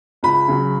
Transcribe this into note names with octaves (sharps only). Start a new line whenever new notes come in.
C#2 B5
C#3 F#3